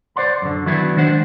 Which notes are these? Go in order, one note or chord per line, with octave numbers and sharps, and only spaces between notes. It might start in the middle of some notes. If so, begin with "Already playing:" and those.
C5 D5 F#5 B5
F#2 D3
D#3 F#3 B3 D4 E4
D#3 G#3 D4 C5 F#5